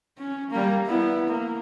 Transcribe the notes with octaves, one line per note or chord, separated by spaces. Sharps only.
C#4
G3 A#3
B3 E4
A#3